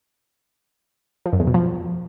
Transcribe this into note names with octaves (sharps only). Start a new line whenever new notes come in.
F3
F#2
E2
B2
F3